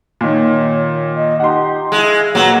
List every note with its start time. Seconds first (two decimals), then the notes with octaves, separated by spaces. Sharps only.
0.21 A#2 D#3 C#5
1.15 D#5
1.40 D#4 G4 F#5 C6
1.92 G#3 E4 F5
2.35 A#2 F#3 B4 F#5 A#5